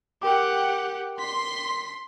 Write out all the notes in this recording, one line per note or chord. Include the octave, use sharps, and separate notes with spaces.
G4 A#4 F#5 G5 D6
C6 B6